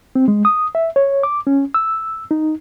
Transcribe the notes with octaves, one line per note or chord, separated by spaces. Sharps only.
C4
G#3
D#6
E5
C#5
D6
C#4
E6
D#4